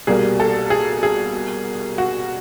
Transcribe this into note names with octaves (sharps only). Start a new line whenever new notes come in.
C2 B2 G3 A#3 G#4
A4
G#4
G#4
F#4